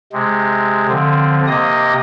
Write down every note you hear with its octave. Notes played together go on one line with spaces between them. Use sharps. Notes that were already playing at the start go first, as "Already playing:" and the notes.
C3 G#3
D3 F3 C4
C3 A#3 D#5 D#6